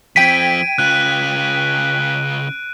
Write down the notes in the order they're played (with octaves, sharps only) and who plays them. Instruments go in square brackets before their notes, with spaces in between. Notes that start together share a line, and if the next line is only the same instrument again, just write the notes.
[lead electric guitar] F3 C4 [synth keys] G5 G#6 B6 [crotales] D7 D#7
[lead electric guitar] C#3 F4 [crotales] F#6